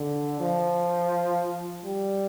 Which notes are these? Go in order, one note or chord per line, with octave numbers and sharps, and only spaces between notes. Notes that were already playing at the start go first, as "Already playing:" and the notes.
Already playing: D3
F3
G3